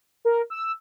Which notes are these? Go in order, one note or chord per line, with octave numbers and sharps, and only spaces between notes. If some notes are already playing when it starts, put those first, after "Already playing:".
A#4
E6